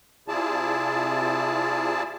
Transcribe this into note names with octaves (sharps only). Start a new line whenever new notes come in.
C3 E4 F4 G#4 D5 A5